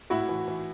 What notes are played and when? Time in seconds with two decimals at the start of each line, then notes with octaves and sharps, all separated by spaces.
0.10 A2 E4 F#4
0.29 E3
0.48 E3